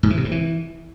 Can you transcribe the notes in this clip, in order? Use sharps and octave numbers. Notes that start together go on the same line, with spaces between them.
G#2
E3
C3
G2
E3